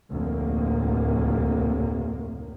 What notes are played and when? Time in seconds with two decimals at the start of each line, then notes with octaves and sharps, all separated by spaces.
0.11 F1 D2 A2 A#3